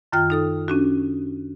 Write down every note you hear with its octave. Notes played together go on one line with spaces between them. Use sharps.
F#2 D#3 F4 G5 F6
D#4 A4 D#6
C#4 D4 F#4